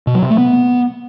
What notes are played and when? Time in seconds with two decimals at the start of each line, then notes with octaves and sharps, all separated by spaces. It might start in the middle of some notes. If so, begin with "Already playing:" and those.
0.07 B2
0.15 F#3
0.22 C3
0.30 A3
0.38 B3